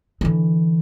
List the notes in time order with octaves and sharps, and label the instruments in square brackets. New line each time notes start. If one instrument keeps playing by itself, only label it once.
[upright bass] D3 E3